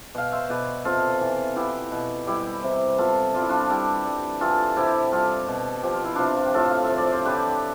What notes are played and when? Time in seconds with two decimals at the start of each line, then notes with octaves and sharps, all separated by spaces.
0.15 B2 F5
0.32 C5 E5
0.49 B2 B4 D5
0.85 C3 F4 A4
1.21 E3
1.56 B3 E4 G4
1.92 B2
2.27 G3 E4 G4
2.64 C3
2.98 B3 F4 A4
3.34 G3 F4
3.42 E4
3.49 D4 F4
3.69 G3 E4 G4
4.05 G3
4.41 E3 F4 A4
4.76 C3 E4 G4
5.12 G3 F4 A4
5.47 B2
5.83 F3 G4
5.94 F4
6.04 E4
6.15 C3 D4 F4
6.37 F4
6.45 G4
6.54 A2 F4 A4
6.70 F5
6.84 E5
6.90 F3
6.97 D5
7.12 C5
7.25 D3 G4 B4